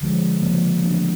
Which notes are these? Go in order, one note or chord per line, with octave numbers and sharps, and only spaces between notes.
D3 F3 G#3
C#3 F3 A#3
E3 A3 D4 F#4